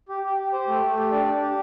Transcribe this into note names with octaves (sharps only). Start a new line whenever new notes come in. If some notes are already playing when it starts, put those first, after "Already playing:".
G4
G4
G4
G4 C5
A3
A3
G4
D4 D5
D4
G4